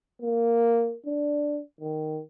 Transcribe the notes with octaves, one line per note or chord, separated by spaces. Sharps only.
A#3
D4
D#3